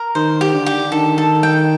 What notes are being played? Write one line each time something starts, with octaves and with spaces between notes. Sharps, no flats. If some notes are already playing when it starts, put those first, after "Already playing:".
Already playing: A#4
D#3 C5
G4
D3
G4
D#3 A4
A4
G5